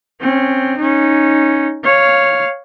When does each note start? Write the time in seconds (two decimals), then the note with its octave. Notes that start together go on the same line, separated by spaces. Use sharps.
0.20 C4 C#4
0.77 C#4 D#4
1.84 C#5 F5